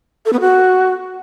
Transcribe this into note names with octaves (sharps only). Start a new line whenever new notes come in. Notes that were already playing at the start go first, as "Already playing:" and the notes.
A4
B3
F#4